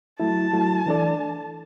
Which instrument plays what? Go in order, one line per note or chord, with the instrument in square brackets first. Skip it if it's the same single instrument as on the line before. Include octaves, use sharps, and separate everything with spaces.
[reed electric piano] F#3 A3 E4 [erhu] A5
[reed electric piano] F#3 A3 E4
E3 D4 A4 D5